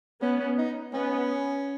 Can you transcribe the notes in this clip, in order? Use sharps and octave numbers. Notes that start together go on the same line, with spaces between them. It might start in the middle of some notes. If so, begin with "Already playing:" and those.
B3 C#4
C#4
D#4
B3 C#4